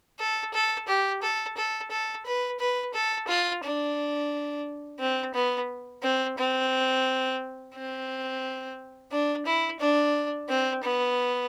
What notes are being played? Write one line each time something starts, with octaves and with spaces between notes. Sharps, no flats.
A4
A4
G4
A4
A4
A4
B4
B4
A4
F4
D4
C4
B3
C4
C4
C4
D4
E4
D4
C4
B3